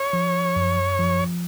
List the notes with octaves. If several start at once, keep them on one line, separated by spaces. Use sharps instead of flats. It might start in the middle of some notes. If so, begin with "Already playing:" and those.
Already playing: C#5
F3
F#2
F3